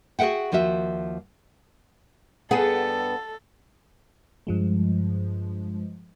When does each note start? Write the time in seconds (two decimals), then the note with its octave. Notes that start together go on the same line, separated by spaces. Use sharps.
0.19 F#4 G#4 B4 E5 F#5 G5
0.52 D#2 F3 F4 F#4 E5
2.51 G2 B3 G#4 A4 F#5 G5 A5
4.47 G2 F3 G#3